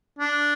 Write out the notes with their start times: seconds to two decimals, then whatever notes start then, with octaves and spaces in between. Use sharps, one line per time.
0.19 D4